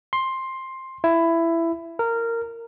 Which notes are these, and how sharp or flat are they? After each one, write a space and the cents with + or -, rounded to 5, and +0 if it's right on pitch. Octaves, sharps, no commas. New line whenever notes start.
C6 +10
E4 +15
A#4 -15